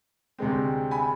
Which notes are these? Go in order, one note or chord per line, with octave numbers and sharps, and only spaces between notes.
D2 C3 G#3 C4
G#5 B5